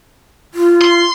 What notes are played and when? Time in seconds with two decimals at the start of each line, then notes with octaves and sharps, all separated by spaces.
0.54 F4
0.82 C6